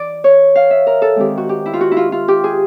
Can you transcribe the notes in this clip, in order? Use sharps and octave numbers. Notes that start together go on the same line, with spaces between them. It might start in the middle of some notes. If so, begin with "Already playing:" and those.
Already playing: E3 D5
C#5
F5
E5
A#4
A4
D#3 G#3 C4 G4
F#4
G4
E4
F4
F#4
E4
F4
F4
G4
G#4